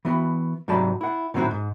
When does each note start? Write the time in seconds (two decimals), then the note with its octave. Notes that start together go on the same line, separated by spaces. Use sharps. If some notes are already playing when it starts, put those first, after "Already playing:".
0.05 E3 B3 F#4
0.68 G#2 C3 F#3 D5 A5 B5
1.01 E4 F#5
1.34 A2 D#3 F#3 C4 E4 F#4
1.51 G#2